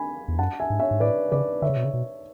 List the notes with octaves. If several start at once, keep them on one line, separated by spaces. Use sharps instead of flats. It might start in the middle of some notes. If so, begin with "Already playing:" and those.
Already playing: G#5 B5
E2
F#2 F#5 A5
E5 G#5
G#2
C#5 E5
G#2
A2 B4 D5
C#3 B4 D5
D3 C#5 E5
C#3
B2
C#3
B2